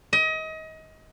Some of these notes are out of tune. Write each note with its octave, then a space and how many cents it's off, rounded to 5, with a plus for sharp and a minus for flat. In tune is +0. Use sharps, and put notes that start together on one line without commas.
D#5 +30